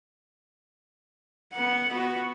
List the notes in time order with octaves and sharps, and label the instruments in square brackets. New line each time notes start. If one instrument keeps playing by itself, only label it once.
[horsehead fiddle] B3 F#5
B3 F#4